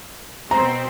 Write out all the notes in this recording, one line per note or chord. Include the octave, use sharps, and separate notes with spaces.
B2 C4 A#5